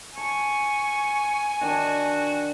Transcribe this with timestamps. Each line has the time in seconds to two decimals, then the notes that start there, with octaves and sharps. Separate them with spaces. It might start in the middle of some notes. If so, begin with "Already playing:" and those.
0.18 G#5 A5 C#6
1.61 D#3 D4 F#4